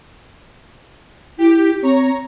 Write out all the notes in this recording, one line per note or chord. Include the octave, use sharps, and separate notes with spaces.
E4 G4
C4 C#5 A#5